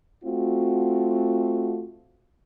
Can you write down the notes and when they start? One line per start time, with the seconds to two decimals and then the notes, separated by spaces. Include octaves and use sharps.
0.24 A3 C4 F4 F#4